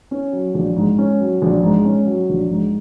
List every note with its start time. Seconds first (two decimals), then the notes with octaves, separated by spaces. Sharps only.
0.11 C#4
0.33 F#3
0.55 A#1
0.76 G#2
0.98 C#4
1.20 F#3
1.42 A#1
1.63 G#2
1.85 C#4
2.06 F#3
2.29 A#1
2.50 G#2